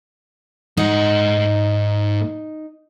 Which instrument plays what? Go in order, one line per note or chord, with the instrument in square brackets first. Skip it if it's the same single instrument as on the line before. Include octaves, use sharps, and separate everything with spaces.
[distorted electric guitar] G#2 F#5 [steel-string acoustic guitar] D#4